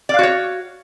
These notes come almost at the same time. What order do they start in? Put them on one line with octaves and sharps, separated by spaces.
D5 F5 F#4 C#5